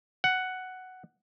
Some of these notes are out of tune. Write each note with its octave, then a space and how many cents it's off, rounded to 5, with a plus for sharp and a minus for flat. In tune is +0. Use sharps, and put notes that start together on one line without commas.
F#5 +5